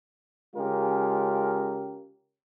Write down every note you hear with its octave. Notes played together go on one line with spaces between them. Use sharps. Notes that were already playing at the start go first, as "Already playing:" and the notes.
C#3 G#3 C#4 F4 G4 A#4